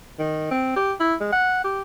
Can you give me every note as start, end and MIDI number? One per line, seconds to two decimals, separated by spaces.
0.19 0.47 51
0.51 0.72 60
0.76 0.93 67
1.00 1.15 64
1.20 1.30 56
1.32 1.63 78
1.64 1.82 67